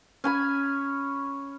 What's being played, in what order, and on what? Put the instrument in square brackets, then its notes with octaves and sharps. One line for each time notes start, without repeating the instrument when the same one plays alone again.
[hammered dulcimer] C#4 G#5 B5